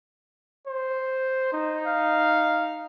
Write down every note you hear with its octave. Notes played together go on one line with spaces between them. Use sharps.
C5
D#4
F5